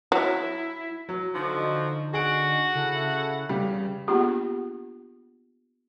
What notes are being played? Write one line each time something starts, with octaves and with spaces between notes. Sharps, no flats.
F#3 E4
F#3
D3 F3 D#4 F#4
F#4 G#4 F#5 D7
C#3 E4 A4
E2 C#3 G3
A#3 B3 D4 F4 G4 G#4